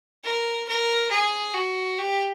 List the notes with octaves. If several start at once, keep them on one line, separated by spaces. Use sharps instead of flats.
A#4
A#4
G#4
F#4
G4